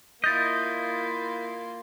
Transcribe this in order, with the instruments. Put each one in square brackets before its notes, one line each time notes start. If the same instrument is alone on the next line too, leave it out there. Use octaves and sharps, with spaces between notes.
[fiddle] A#3 F4 [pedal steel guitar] E4 D#5 [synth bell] G6 A6